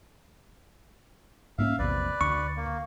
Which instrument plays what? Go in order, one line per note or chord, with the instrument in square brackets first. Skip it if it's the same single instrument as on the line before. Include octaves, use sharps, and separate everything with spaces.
[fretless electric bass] G#2 A#3 C#4 [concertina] E5 F5
[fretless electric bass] A#1 E2 C3 [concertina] B4 D5
[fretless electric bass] D2 [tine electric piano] C#6
[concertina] A#3